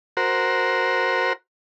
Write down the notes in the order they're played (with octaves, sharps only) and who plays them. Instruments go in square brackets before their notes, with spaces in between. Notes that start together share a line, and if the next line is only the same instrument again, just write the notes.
[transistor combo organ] F#4 A#4 C5